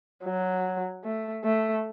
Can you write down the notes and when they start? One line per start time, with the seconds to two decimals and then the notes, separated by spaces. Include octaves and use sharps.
0.24 F#3
1.04 A3
1.44 A3